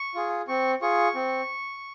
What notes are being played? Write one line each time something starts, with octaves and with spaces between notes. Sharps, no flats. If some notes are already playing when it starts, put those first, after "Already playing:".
Already playing: C#6
F4 G#4
C4 C#6
F4 G#4 C#6
C4